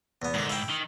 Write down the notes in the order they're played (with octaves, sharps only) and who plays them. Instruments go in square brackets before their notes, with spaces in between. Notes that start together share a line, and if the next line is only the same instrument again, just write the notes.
[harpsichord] E2 B3
[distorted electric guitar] G#2 [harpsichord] D3 D#3
[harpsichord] E4 G5
[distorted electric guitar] D#3